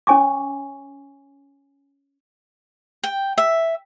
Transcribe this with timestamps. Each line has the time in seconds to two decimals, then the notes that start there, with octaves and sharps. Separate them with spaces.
0.07 C#4 C#5 G#5 C#6 D6
3.03 G5
3.38 E5